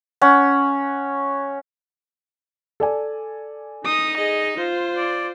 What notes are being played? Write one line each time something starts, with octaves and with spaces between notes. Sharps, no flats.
C#4 F#5
A4 D5 G#5
D#4 D#6
G#4 D#5
F4 C5
D5